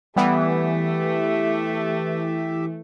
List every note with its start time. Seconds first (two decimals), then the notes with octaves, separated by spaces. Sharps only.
0.16 E3 G3 A3 B3 G4 E5